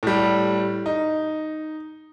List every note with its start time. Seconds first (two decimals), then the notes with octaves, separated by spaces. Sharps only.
0.03 A2 G3
0.86 D#4